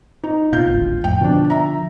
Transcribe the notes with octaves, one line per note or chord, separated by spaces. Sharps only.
D#4
B2 F4 G6
D1 G#1 D2
F2 A2 G5
B2 D3 E3 F3 D4
E5 A#5